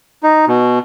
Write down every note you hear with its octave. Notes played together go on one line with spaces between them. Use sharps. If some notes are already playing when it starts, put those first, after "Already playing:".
D#4
B2